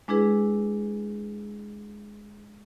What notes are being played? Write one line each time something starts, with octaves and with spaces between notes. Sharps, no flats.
G#3 D4 E4 G#4 B4